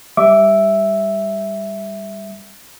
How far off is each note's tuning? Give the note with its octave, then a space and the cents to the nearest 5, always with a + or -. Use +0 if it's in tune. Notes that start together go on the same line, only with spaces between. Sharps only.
G3 +15 E5 +0 D6 -15